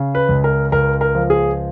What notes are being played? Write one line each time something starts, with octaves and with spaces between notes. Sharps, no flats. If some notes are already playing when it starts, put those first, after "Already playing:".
Already playing: C#3
B4
C#2
A#4
C#2 A#4
A#4
F3
G#4